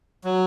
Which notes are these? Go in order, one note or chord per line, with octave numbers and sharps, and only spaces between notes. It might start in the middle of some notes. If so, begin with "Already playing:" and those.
F#3